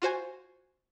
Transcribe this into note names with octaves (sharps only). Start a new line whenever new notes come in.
F4 F#4 C5 G#5